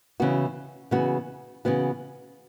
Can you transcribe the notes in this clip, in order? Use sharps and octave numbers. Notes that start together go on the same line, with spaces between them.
C#3 E3 B3 F#4
C#3 E3 B3 F#4
C#3 E3 B3 F#4